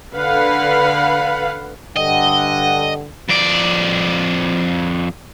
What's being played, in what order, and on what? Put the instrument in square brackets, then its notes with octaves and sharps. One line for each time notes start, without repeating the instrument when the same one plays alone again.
[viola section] D3 B4 F5 F#5 B5
[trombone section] G2 D3 [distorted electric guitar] D#5 [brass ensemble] F#5 G5
[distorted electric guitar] F2 D5